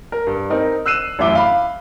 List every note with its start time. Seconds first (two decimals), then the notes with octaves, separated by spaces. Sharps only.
0.12 A#4
0.27 G2
0.50 C4 D#4 A#4
0.86 E6 F#6 C7 D#7 E7
1.19 A1 F#2 E4 E5 D6 G7
1.35 F5 B5